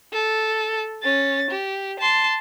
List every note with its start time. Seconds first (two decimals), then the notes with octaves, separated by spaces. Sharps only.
0.13 A4
1.03 C#4 A6
1.50 G4
1.99 A5 C6